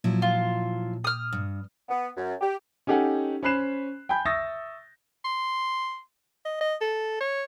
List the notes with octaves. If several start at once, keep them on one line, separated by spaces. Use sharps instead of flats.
A#2 F3 F#3 E4
F4
D#6 F6
G2
B3
F#2
G4
C#4 D#4 G4 A4 F#5 G#5
C#4 C5 B5 F#6 C7 E7
G5 G#5 B5 G6
E5 C#6 D#6 E6 A6 A#6
C6
D#5
D#5
A4
C#5